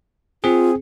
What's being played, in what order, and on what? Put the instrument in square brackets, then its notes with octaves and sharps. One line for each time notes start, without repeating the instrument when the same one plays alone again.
[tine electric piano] C4 G#4 [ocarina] F4